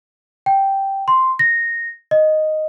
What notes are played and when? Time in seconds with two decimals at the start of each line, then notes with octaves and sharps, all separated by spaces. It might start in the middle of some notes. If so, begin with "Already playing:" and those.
0.46 G5
1.08 C6
1.39 A#6
2.11 D#5